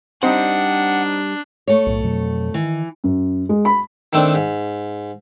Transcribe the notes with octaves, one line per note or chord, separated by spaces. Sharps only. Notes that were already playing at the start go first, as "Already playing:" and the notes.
G3 C4 D4 D#4 C5 F#5
A3 C#5
B1 A2
F2 B2 F#3
D#3 E3
F#2
G#3
B5
D#3 A3 C4 D4
G#2